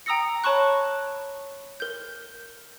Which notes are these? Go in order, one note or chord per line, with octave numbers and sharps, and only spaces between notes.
G5 A#5 D#6 E6 A#6 C#7
C#5 A5 B5 C#6 F#6
A#4 G6